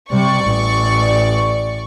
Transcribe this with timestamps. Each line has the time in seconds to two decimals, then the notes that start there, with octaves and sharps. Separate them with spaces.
0.11 C3 G3 D5 C#6
0.45 A1